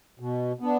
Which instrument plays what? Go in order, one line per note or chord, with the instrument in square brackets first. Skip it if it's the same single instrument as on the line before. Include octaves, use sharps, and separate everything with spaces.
[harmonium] B2
B3 D4